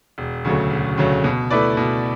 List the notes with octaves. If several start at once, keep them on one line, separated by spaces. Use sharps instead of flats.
E1
D2 C#3 F#3 A3
E1
D2 C#3 F#3 A3
B2
A3 E4 B4 D5
B2